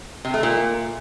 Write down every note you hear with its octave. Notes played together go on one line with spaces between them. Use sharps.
C3
A3
A#2